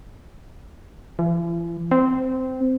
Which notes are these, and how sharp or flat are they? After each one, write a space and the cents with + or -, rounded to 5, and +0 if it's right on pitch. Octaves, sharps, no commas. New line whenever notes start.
E3 +45
C4 -15